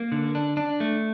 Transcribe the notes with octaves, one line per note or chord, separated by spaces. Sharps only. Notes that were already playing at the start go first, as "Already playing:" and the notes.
Already playing: A#3
D3
D4
D4
A3